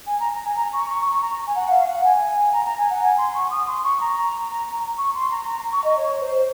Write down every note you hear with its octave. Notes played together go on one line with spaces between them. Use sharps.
G#5
A#5
A#5
G#5
A#5
C#6
C#6
C#6
A#5
G#5
F#5
F5
F#5
G#5
A#5
A#5
G#5
F#5
G#5
C6
C#6
D#6
C6
C#6
A#5
C#6
C6
A#5
A#5
C#6
D#5
C#5
C5